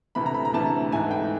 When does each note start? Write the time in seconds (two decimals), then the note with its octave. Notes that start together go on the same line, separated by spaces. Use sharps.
0.15 D2 C3 E3 A3 B5
0.26 A#5
0.34 B5
0.45 A#5
0.53 D2 C3 E3 A3 A5
0.92 G#2 E3 A3 G#5
1.11 G5